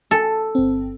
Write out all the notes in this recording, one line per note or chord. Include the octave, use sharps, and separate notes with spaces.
A4
G1 C4